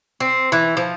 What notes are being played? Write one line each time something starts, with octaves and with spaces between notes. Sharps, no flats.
C4
E3
F3